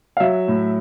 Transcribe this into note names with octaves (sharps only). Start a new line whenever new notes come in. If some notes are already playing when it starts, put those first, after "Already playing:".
F5
F#3 E5
A2